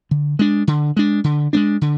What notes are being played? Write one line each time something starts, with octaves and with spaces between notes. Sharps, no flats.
D3
G#3 D4
D3
G#3 D4
D3
G#3 B3 D4
D3